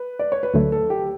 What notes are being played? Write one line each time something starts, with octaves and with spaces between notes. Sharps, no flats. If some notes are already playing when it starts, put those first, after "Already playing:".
Already playing: B4
D5
C#5
B4
D2 D3 F#3 A3 A4
A4
G4